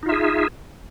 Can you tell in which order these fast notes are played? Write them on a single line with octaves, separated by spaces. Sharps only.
D#4 F4 E5 G#4